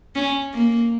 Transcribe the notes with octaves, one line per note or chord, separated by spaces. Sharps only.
C#4
A#3